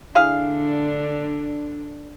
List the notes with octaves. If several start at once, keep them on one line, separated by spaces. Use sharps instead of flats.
D3 D4 E4 G#4 F5